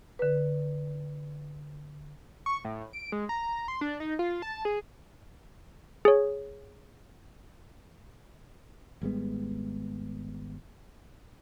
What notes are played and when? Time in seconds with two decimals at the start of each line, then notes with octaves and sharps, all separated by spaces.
0.19 D3 B4
2.46 C#6
2.64 A2
2.93 D7
3.12 G#3
3.29 A#5
3.68 C6
3.81 D4
4.00 D#4
4.19 F4
4.42 A5
4.65 G#4
6.05 G#4 C#5
9.01 G#1 G3 G#3 B3